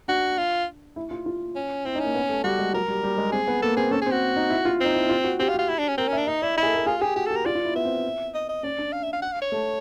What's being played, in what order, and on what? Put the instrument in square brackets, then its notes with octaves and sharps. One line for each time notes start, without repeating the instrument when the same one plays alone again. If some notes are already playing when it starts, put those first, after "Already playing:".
[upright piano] D4 [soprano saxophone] F#4
[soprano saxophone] F4
[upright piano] E4
F4
F4
[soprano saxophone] C#4
[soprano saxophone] C4 [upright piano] E4
[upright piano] D#4
[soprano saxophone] C#4
[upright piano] A#3
B3
A3
[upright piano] G3 [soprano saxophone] F#4
[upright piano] G#3
[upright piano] F#3 [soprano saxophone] A#4
[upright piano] G3
G3
G#3
[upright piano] C4 [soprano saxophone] G#4
[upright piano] B3
[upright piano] A#3 [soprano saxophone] A4
[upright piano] C4 [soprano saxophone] G#4
[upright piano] C#4 [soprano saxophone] A4
[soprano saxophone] G#4
[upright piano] C4
[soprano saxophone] F#4
[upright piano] D#4
E4
F4
[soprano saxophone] C4 [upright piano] D#4
[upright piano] E4
F4
F#4
[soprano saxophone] C4 [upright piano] G4
[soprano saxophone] F4
[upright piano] F#4
[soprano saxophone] F4
E4
D4
C#4
[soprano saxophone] C4 [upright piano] A#4
[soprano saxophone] C#4
[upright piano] E5
[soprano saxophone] D4
[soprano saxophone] D#4 [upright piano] D#5
[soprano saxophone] E4 [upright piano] D5
[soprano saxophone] E4 [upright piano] D#5
[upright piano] G#4
A4
A#4
A4
[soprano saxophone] F4 [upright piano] G#4
[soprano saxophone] G4 [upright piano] G#4
[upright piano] F#4 [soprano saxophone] G4
[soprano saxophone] A4
[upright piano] G4
[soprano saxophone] A#4
[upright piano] F4 [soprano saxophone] D5
[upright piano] F4
E4
[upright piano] B3 [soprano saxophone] E5
[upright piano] C4
[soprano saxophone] D#5
D#5
[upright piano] C#4 [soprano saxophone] D5
[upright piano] D4
[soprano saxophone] F5
E5
F5
F#5
F5
C#5
[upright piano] A3